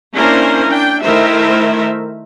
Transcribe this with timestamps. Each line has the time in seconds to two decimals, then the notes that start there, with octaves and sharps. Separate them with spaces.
0.13 A#3 C#4 D4 E4 A#4 C5
0.67 D4 G5
1.03 D#3 A3 E4 A#4 C5 E5